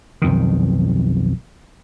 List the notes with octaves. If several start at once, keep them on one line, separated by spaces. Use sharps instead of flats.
B1 F2 D#3